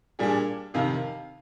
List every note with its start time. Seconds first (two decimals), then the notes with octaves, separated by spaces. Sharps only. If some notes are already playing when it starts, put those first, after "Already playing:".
0.19 A#2 G3 D4 G#4
0.74 F2 C3 D#3 F5